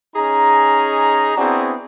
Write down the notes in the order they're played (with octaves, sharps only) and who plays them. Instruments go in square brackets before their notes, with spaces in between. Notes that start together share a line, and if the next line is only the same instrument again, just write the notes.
[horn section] C#4 D#4 G#4 A#5
B3 C4 D4 E4 F#4 G#4